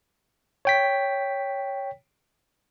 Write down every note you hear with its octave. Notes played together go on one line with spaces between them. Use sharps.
C#5 G5 B6